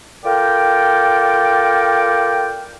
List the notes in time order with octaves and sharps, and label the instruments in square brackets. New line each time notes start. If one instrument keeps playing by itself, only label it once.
[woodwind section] F4 A4 A#4 D5 G5